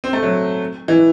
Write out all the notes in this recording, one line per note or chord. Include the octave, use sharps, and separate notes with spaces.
C4
A3
F#3
E3